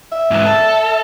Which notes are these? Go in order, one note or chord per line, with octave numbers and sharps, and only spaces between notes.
E5
G#2 E3
A4